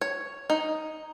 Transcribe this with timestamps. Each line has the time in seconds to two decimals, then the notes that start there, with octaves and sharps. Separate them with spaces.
0.01 C#5
0.50 D#4